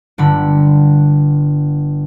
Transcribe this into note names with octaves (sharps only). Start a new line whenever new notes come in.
G1 D3 B5